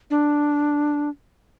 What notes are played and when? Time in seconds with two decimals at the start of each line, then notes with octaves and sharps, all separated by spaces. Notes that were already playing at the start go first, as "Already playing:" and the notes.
0.10 D4